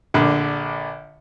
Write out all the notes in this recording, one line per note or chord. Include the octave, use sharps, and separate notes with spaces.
A#1 D3